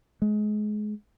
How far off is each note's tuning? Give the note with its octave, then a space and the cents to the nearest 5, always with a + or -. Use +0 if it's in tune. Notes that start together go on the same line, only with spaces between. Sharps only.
G#3 +25